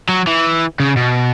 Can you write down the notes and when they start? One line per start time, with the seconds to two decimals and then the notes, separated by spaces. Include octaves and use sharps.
0.09 F#3
0.27 E3
0.80 C#3
0.97 B2